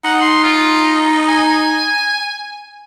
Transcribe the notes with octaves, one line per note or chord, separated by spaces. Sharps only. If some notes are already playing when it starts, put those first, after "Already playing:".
D#4 F#5
C6
F4
G#5